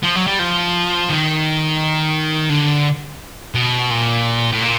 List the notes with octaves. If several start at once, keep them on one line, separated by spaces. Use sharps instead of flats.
F3
F#3
G3
F3
D#3
D3
B2
A#2
A2
A#2